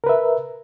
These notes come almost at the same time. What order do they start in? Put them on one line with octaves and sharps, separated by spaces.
A#4 B4 E5